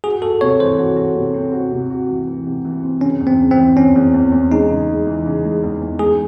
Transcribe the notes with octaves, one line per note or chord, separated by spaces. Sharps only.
F#4 G#4
F#4 A4
C3 C#5
E3 C5
F#4
F#4
C3
C4
F#4
C3
F#4
E3
E3
C3
E3
C4
C#3 C#4
E2
C4
C#3
C4
E3
E2 C#4
E2
E2
E2
G#3 D#4
C#3
G#3
E3
C#3
G#3
E2
E2
G#3 G#4